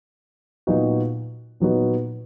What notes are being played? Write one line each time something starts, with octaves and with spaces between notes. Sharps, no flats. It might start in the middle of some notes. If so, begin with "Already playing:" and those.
A#2 F#3 B3 D#4 F#4
A#2 F#3 B3 D#4 F#4